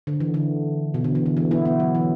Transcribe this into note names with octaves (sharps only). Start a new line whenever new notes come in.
D3
E3
D3
B2
D3
E3
D3
E3
B3 E4
B3 E4
F#3
E3